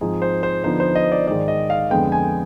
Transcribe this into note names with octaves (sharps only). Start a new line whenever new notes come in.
G#2 F3 C4 D#4 G#4
C5
C5
D3 F3 B3 D#4 C5
C5
D#5
D5
G#2 D#3 G#3 D5
D#5
F5
F2 D3 G#3 B3 G5
G#5